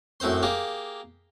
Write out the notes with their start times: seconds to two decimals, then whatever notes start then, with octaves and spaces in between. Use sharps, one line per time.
0.20 F#2 A2 C4 C5 C6
0.43 A#3 G4 G#4